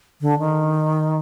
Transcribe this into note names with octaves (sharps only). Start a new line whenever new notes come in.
D3
D#3